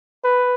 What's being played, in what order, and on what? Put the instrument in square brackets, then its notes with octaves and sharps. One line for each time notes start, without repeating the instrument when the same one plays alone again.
[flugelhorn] B4